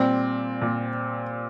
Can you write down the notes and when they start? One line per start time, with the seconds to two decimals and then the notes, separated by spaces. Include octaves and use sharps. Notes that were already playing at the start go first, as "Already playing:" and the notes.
Already playing: A#2 G3 C4
0.61 A#2